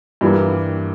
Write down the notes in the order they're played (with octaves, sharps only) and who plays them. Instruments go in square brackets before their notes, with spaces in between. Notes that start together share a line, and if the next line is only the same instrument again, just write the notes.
[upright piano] G2 E3 G3 A#3